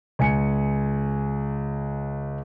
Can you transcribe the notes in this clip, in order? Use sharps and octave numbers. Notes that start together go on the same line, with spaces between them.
C#2 G#5 C#7